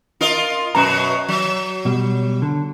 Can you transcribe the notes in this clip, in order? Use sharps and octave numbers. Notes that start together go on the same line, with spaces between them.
F4 A#4 D#5
F#2 B2 F#4 A#5
F#3
B2 G3
D3